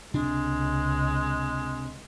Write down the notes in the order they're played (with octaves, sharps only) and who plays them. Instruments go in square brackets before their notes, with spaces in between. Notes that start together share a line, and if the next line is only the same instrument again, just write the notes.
[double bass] C#2 [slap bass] C3 D4 [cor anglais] G#3